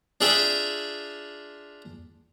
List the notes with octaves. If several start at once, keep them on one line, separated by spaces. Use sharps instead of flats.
D4 F4 G#4 D5 E5 G5